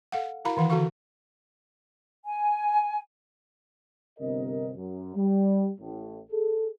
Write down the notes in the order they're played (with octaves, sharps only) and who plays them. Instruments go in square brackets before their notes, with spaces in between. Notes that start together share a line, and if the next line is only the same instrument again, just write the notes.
[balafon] A4 F5 F#5
E4 F#4 A#4 F5 A#5 B5
D#3 E3 F5 F#5
D3 F#4 A4 F5 C#6
[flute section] G#5
[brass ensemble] G1 C3 A#4 D#5
F#2
G3
A1 A2
G#4 A4